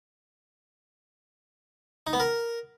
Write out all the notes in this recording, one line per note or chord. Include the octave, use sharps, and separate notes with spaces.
D#4
B3
A#4